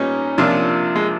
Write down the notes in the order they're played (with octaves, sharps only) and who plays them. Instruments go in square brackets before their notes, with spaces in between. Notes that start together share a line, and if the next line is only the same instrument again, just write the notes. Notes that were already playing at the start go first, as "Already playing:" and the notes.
Already playing: [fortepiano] A#2 G3 B3 D#4 [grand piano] C#4
[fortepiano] C3 F3 A#3 D4 F4
[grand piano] G#3